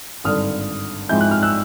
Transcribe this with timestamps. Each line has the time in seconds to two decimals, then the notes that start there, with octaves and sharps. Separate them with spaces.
0.24 G#1 G2 D3 D#6 F6
1.09 G#2 F3 G#3 C4 E4 G6
1.21 F#6
1.31 F6
1.43 E6 F#6